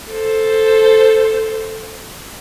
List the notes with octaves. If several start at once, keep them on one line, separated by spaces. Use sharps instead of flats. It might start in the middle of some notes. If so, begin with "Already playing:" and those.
A4 C5